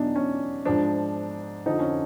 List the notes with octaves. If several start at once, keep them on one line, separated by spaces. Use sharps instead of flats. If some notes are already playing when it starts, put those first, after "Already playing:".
Already playing: E2 B2 F#3 D4 D#4
C#4
G#2 F3 D4
F2 D3 F3 D#4
C#4